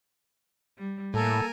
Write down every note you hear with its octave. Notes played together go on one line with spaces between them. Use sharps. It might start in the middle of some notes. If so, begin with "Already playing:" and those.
G3
A2 A#3 A4 A#4 G#5